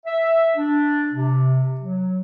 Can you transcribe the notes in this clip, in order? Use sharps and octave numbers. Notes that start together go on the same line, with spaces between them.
E5
D4
C3
F#3